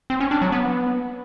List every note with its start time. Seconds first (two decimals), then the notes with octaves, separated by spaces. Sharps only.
0.10 C4
0.20 C#4
0.31 D4
0.42 F#3
0.52 B3